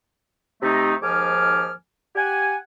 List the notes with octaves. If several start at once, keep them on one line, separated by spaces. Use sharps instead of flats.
C3 A3 D#4
D#2 G#2 F3 G#5 D6 F6
G4 F#5 G#5